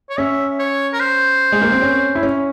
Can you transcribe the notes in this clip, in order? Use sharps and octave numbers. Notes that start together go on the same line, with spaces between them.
C#5
C#4 E5
C#5
A#4
C5
G#3
A#3
C4
C#4
E4
C#4